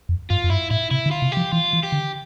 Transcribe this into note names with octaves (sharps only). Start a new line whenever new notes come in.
F2
G2 F4
F2
G2 E4
A2 E4
C3 E4
D3
F4
C3
F3 G4
E3 F4
E3
G4
D3